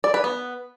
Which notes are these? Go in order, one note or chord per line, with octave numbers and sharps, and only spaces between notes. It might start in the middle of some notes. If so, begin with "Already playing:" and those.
D5
B4
B3